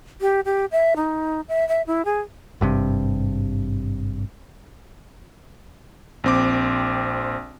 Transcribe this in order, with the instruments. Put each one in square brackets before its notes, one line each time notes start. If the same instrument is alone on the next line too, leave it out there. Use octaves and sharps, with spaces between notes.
[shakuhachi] G4
G4
E5
D#4
E5
E5
E4
G#4
[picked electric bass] G#1 G2 C3
[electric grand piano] A#1 C4 D6